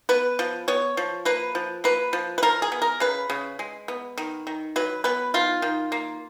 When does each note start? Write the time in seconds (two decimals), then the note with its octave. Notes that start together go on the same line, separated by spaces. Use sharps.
0.09 B3 B4
0.39 F3
0.68 B3 C#5
0.97 F3
1.25 A#3 B4
1.55 F3
1.84 A#3 B4
2.13 F3
2.38 B4
2.43 F3 A#4
2.62 G#4
2.72 B3
2.82 A#4
3.00 C#3 B4
3.30 C#3
3.59 G#3
3.88 B3
4.18 D#3
4.47 D#3
4.76 F#3 B4
5.04 B3 B4
5.34 D#3 F4
5.62 D#3
5.92 A#3